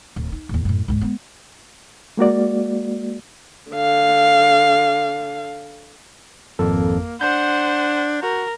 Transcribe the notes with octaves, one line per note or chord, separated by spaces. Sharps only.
D1
D#4
A1 D#2
F#2 A2
C#2 G#2
G#3 B3
G#3 A#3 F#4 D5
D3 F5
G#1 F2 A#3 A4
D4 C5 F#5 G6
F#4 A#4